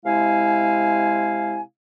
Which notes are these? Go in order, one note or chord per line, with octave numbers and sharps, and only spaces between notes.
C3 G#3 E4 F5 G#5